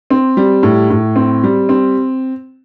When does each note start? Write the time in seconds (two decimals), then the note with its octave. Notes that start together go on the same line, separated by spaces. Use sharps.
0.10 C4
0.37 G3
0.63 A2
0.90 A2
1.16 C4
1.44 G3
1.69 C4